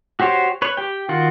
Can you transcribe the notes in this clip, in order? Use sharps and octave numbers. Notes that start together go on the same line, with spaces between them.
F#4 G4 C5 C#5
B4 C#5
G4 G5
D#3 F4 F#4